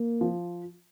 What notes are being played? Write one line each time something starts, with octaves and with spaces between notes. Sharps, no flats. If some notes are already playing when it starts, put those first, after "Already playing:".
Already playing: A#3
F3